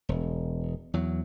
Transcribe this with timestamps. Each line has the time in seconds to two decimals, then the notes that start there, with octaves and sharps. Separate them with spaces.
0.09 E1
0.94 E2 F#3